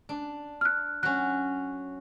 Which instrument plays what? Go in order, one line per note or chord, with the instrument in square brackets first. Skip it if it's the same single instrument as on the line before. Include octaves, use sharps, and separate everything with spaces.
[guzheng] D4
[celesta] F6 F#6
[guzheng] F#3 C#4 [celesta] F#6